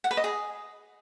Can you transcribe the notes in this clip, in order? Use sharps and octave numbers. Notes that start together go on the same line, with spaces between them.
F#5
B4
D#5
G#4